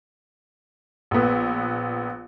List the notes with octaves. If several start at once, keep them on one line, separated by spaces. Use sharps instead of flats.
A#1 B3